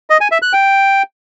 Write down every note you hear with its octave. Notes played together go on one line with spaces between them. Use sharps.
D#5
G#5
E5
F#6
G5